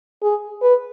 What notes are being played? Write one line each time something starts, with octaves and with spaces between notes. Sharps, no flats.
G#4
B4